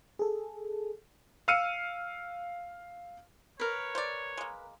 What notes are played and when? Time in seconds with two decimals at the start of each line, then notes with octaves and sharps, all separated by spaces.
0.19 G#4 A4
1.48 F5 E6 F6 C#7 D#7
3.60 A#4 B4 C#5
3.95 C5 D5
4.37 G#3 A#3